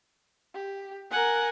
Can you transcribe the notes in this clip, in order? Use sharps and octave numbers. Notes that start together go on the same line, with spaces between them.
G4
A#4 F#5 G#5